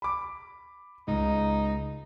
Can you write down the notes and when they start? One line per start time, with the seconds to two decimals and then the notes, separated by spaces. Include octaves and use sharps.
0.02 B5 D6
1.08 C#2 D#4